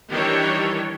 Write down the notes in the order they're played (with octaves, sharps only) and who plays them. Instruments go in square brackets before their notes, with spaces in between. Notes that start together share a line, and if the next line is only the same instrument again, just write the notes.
[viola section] D#3 E3 G3 D4 G4 C#5